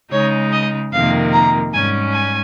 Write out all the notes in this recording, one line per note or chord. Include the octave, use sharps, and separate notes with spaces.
C#3 G#3 D#4 C#5
D#5
F2 C3 D#3 A#3 F5
A#5
G#2 G3 C#4 G#5
G#5